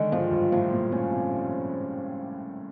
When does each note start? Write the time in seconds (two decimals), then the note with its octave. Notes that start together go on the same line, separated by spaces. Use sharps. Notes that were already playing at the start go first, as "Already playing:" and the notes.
Already playing: D3 D#3 G#3
0.12 G#2 F3
0.31 G2
0.52 A2 F3
0.72 A#2
0.92 A#2 C#4
1.12 C3